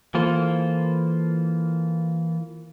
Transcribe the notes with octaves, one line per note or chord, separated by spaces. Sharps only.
E3 A#3 F4 A4 C5